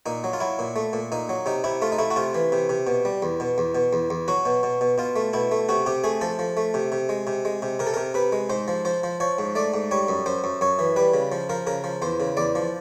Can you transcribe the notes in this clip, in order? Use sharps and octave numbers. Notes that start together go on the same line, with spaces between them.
A#2 D#4
F#3
F4
F#3 E4
A#2
A3
A#2
A#2 D#4
F#3
C3 D#4
C3 E4
A3 F4
D#4
A3 E4
F#4
C3 F4
E3
C3
C3
B2
G3
E2
B2
E2
B2
E2
E2
F#3 F#4
B2
B2
B2
B2 F4
A3
B2 E4
A3
C3 F#4
C3 G4
A3 G#4
F3 A4
F3
A3
C3
C3
G#3
C3
G#3
C3
C3 A#4
A4
C3 A#4
C3 B4
G#3
G#2 C5
F3
F3 C5
F3
F3 C#5
G#2
A3 D5
G#2
G3 C#5
F#2
F#2 C5
F#2
F#2 C#5
E3
G3 B4
C#3
F3
F3 A#4
C#3 A#4
F3
E2 C5
C#3
E2 D5
F3